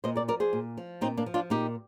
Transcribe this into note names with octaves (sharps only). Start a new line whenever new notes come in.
A#2 C5 D#5
A#4 D5
F3 A#4 D5
G#4 C5
A#2
F3
A#2 C4 D#4
A#3 D4
F3
D4 F4
A#2 D#4 G4